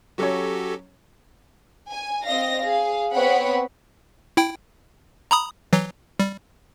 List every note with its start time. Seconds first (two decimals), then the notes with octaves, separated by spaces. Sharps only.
0.18 F#3 C#4 F#4 G4 A4 C#5
1.90 G#5
2.25 C4 D#5 F5 A#6
2.63 G#4 F5
3.16 B3 C4 C#5 F#5 B5
4.37 E4 G5
5.31 A#5 B5 D#6
5.73 E3 F#3
6.19 G3